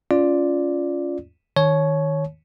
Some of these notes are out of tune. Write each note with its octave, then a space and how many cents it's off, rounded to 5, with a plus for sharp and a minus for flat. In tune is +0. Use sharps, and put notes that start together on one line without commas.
C#4 +20 F4 +0 D5 +0
D#3 +0 C#5 +0 A5 -40